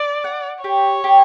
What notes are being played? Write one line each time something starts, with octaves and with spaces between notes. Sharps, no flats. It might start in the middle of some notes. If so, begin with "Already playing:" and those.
Already playing: D5
F#5
G4 C#5
G4